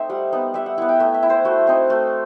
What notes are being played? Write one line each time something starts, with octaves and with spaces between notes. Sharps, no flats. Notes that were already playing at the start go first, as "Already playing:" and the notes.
Already playing: A3 C4 D#4 C5 E5
G3 F#5
B3 D#4
G3 E5
F#5
B3 E4 F#5
G5
A3 E5
E5
E4
C5
A3 F#4
C4 D#4
A3